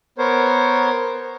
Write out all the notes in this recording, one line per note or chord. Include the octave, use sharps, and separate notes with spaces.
B3 A#4 C5 C#5